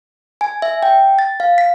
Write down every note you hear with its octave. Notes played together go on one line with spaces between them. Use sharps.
G#5
E5
G5
A6
F5
B6